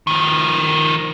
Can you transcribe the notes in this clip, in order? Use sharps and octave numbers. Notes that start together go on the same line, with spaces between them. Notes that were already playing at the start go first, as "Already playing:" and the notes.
D#3 F3